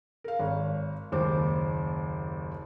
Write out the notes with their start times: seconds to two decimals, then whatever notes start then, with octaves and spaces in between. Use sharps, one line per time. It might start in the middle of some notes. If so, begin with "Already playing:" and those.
0.24 A#4 F5
0.39 G#1 C#5 F5
1.12 F#1 D#2 C5 D6